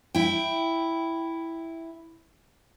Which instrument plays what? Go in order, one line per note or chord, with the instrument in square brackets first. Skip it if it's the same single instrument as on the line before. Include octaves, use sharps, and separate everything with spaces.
[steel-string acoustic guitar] E4 G5